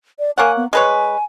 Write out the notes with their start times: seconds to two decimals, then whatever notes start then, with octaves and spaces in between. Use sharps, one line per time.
0.19 D5
0.38 A#3 C#5 F#5 G#5
0.57 B3
0.73 G#3 B4 C#5 G#5